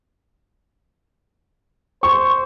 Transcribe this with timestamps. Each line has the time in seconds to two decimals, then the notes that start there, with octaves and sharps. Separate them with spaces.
2.03 C5 C#6